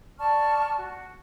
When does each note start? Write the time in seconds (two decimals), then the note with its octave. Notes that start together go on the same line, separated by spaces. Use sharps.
0.19 D5 A5 C#6 F6
0.78 F#4